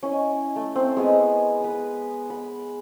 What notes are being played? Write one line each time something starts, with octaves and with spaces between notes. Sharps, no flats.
C#4 E4 D#5
A3
C4
G#3 B3 G#4
B4 D#6
B5